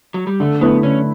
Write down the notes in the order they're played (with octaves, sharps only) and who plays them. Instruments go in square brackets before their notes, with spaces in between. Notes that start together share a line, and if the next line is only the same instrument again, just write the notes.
[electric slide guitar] F#3
G3
[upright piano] D3 [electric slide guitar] A3
[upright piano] A3 E4 B4 [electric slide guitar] B3
[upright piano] D3 [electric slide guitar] C#4